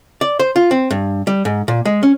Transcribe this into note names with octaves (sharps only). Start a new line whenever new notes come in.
D5
C5
F4
C4
G2
G3
G#2
A#2
G#3
C#4